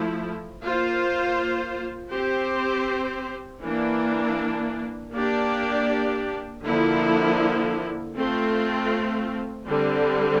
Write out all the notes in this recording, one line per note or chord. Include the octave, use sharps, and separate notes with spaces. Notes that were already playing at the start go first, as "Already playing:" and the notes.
Already playing: F3 A3 E4
A#3 F4 C5
C4 G4 C5
E3 A#3 D4
A#3 D4 G4 D5
D3 F3 A#3 E4
A3 C4 F4
D3 G3 C4